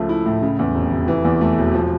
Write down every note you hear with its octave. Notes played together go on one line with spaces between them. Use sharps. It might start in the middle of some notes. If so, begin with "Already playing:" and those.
Already playing: C#2 F3 A3
E4
A2
C#3
E2
F1
F1
E3
E2
A3
E1
F3